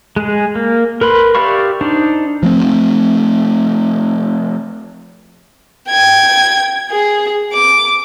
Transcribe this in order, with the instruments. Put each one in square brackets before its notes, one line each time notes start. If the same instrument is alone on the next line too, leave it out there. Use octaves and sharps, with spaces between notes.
[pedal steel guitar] G#3 G#4
A#3
A#4 B4 B5 C6
G4 D5 E5 F5 C#6
D4 D#4 C5 D5
[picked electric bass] F3 A3 C4
[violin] G5 G#6
G#4
D6